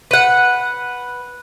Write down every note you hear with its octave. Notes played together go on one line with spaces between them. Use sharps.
B4 F#5